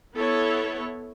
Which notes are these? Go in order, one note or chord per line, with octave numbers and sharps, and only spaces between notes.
B3 E4 A4 C#5